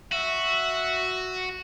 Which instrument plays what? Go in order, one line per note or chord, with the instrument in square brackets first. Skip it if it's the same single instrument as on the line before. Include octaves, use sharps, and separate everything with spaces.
[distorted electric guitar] F#4 [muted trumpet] E5